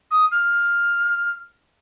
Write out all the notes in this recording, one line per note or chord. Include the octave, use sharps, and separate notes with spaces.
D#6
F6